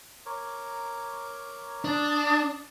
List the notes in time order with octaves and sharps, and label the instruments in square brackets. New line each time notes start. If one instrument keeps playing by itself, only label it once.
[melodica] A#4 C#5 D6
[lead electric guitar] D4 [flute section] A5 D#6